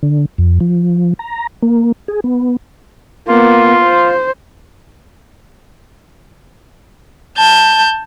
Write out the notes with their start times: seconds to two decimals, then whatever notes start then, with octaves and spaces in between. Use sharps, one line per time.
0.03 D3
0.38 F2
0.60 F3
1.19 A#5
1.62 A#3
2.08 G#4
2.24 B3
3.28 A#3 B3 F4
3.84 C5
7.37 A5 G6